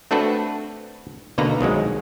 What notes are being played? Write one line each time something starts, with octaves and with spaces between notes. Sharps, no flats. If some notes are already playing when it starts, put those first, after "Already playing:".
A3 C4 D4 F#4 A4 B4
B2 D3 A#3 D#4 B4 A#5
C2 D#3 F#3 G#3